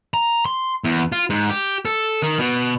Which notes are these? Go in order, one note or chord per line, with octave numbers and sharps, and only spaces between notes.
A#5
C6
E2
F4
G#2
G4
A4
D#3
B2